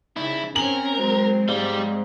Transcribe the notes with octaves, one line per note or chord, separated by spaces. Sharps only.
C2 C#3 D#4 E4
C4 C#4 A#4 G#5 F#7
F#3 G#3 C4 F#4 C5
G#2 G3 D5 F5